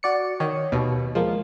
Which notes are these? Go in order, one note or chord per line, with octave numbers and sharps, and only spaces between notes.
F#4 D5 C#7
D#3 C#5
D#2 B2 D#3
F3 G#3 A#3